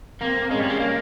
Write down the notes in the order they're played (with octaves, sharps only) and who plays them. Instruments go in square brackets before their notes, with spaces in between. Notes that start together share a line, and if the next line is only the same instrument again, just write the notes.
[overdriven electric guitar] A#3 [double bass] C4
[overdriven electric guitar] G#3 [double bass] C#4
[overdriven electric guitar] G3
G#3
A#3